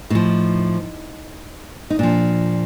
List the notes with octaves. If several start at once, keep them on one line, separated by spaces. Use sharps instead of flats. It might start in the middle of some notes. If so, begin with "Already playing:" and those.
A2 F3 D#4
D#4
A#2 F3 D4